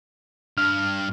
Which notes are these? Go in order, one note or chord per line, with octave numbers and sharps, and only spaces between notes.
G2 F6